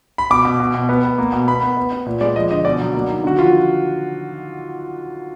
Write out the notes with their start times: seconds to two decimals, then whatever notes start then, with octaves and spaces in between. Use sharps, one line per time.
0.18 B5
0.30 B2 D6
0.45 B2
0.60 B2
0.74 B2
0.89 B3
1.04 B3
1.18 A#3
1.32 B2
1.47 B3 B5
1.62 B3
1.77 B3
1.92 B3
2.06 A#2
2.21 G#3 D5
2.36 F3 D#5
2.51 D3 D#5
2.65 B2 D5
2.80 F#3
2.94 A#3
3.10 D#3
3.24 D3 F#4
3.38 F3 F4